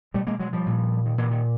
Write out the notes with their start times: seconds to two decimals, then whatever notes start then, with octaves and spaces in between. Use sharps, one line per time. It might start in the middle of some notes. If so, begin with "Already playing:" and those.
0.14 B2 G3 A3
0.27 G#3 A#3
0.40 F#3 G#3
0.53 F3 G3
0.66 A#2
1.06 D#3
1.18 A#2 D3 E3
1.31 D#3